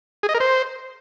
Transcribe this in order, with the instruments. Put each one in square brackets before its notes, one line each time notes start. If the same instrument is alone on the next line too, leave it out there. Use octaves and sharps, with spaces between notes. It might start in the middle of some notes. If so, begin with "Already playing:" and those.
[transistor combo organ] G#4
D#5
A#4
C5